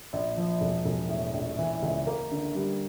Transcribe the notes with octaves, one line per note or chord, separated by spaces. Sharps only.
A#1
F3
E1
E1
A2
A#1
E3
C#2
A#3
D3
G3